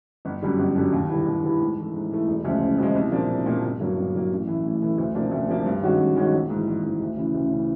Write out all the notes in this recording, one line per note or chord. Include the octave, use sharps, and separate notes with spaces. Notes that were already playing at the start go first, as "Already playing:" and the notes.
G1
F#2 D3 G3
G1
F#2 D3 G3
D#2
D3 G3 B3 E4
D#2
D3 G3 B3 E4
G#2
E3 A3
G#2
E3 A3
E1
D2 C#3 F3 G#3
E1
D2 C#3 F3 G#3
C2
A#2 F3 A#3 D4
C2
A#2 F3 A#3 D4
G1
G2 D3 F#3 A#3
G1
G2 D3 F#3 A#3
A1
A2 E3 A3
A1
A2 E3 A3
D2
C3 F3 A#3 D4
D2
C3 F3 A#3 D4
G2
D#3 G#3 C#4 F#4
G2
D#3 G#3 C#4 F#4
A#1
G#2 E3
A#1
G#2 E3
D2
C#3 E3
D2
C#3 E3